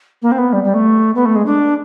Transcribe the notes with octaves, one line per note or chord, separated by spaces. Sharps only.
A#3
C4
B3
G3
G3
A3
B3
A3
G#3
D4